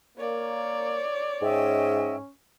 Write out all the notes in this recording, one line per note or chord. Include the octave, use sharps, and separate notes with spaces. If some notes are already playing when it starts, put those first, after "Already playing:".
A#3 C#5 D5
G#2 C#4 D#5 E5 G5